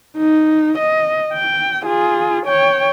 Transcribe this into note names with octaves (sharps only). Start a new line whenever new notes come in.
D#4
D#5
G5
F4 G#4
C#5 G5